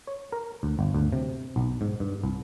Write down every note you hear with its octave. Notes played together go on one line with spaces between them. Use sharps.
C#5
A#4
D2
G1
D2
C3
B1
G#2
G2
C2